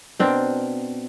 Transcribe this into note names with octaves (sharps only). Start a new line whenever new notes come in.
B2 C4 D4 A#4